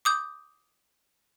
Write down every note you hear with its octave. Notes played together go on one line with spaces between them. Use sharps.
D6 D#6 G6